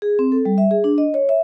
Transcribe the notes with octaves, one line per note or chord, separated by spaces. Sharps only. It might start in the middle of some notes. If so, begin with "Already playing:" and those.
G#4
C4
A4
G3
E5
G#4
D4
D#5
C#5
E5